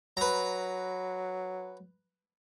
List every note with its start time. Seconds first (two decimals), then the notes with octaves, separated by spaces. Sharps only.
0.17 F#3 B4 A#5